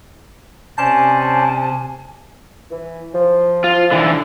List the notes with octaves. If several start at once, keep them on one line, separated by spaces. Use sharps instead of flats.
C3 C#4 C5 D5 G#5 A5
E3
F3
F4
D3 E3